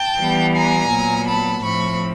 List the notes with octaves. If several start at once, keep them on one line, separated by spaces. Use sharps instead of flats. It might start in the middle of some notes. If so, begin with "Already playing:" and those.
Already playing: G5 A5
E3 G3 B3
G#5 A#5
A#2 F#3 B3
A5 B5
A2 F3 A3 C4 B5 C#6